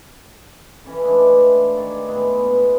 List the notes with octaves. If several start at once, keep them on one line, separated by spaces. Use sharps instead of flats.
E3 C#4 E4 A4
E3 G#3 A3 D4
F5
D#3 C#5 D5
A2 G#3 B3 C6
B2